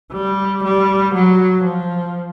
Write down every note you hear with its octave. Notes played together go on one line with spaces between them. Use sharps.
G3
G3
F#3
F3